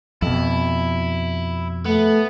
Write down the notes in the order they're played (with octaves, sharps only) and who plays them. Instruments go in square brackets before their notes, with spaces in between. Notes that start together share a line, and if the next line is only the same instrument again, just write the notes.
[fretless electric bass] F2 B2 [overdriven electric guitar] E4
[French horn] A3 [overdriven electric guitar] B3